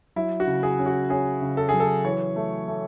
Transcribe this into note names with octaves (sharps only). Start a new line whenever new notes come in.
F#3 E4
F#4
C#3
G#4
C#4
F#4
C#4 G#4
C#3
A4
F#3 G#4
A4
E3 C#5
A3
A3